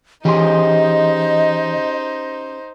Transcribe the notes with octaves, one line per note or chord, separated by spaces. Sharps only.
E3 C#4 D#4 G4 G#4 C5 D#5 C6